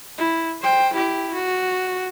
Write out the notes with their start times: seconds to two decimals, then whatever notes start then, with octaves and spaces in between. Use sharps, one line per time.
0.18 E4
0.61 C5 G5
0.93 E4 G4
1.34 F#4